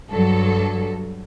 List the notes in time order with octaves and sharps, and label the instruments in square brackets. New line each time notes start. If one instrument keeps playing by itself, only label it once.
[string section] G2 F#3 A4